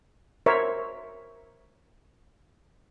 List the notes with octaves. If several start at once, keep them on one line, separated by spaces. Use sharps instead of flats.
A#4 C5 C#5 E5